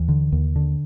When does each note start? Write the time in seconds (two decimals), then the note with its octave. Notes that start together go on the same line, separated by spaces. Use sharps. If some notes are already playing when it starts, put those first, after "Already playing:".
Already playing: D#2 E3
0.08 D3
0.32 D#2
0.56 D3